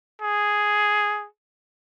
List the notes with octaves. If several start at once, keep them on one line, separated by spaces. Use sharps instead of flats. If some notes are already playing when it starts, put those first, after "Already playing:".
G#4